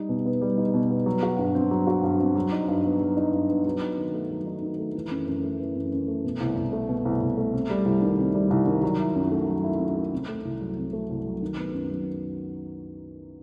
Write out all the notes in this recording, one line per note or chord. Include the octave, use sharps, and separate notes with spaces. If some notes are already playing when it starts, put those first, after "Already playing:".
Already playing: G3 D#4
B2
B3
G3
D#4
B2
B3
F#3
F#4
G2
C4
F#3
F#4
G2
C4
F#3
D#4
G2
B3
F#3
D#4
G2
B3
F#3
D#4
D#3
A3
F#3
D#4
D#3
A3
E3
F#2
F#2
A3
E3
F#2
F#2
A3
B2
C2
C2
A3
B2
C2
C2
A3
C3
G3
C2
D#3
C3
G3
C2
D#3
F#3
E4
F#2
A3
F#3
E4
F#2
A3
C3
A3
C2
F#3
C3
A3
C2
F#3
D#3
B3
F#2
F#3